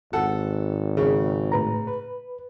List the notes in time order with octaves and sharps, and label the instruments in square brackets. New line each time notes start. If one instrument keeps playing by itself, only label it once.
[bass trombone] G#1 [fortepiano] A4 F#5
[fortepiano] C#3
[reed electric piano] A2 B4 A#5
B4